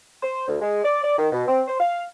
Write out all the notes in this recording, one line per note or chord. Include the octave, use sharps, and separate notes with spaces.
C5
D2
G#3
D5
D5
D#3
B2
C4
C5
F5